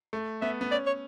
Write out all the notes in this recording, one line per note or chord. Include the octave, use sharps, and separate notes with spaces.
A3
B3 E5
B3
C#4 D5
C#5